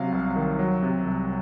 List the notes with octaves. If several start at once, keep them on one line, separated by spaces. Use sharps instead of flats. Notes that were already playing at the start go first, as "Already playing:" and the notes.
Already playing: C3 F#3 F5
C2
D#3
F#3
C3
C2